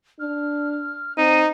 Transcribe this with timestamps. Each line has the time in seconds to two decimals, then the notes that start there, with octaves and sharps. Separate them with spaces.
0.20 D4 F6
1.18 C4 D#4 D#7